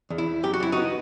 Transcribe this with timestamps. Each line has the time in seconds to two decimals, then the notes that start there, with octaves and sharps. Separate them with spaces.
0.10 E2
0.18 E4
0.27 E2
0.43 F#2 G4
0.54 F#4
0.60 F#2 E4
0.72 B3 D#4 F#4